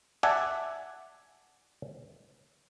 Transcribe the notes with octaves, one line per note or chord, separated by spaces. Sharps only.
D5 E5 F#5 G#5 A5